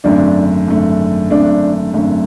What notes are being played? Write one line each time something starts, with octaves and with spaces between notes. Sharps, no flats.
G#1 F#2 D3 A3 D4
G#1 F#2 D3 A3
G#1 F#2 D3 A3 D4
G#1 F#2 D3 A3